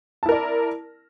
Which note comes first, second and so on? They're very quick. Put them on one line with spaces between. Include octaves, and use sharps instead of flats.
A5 E4 A#4 D5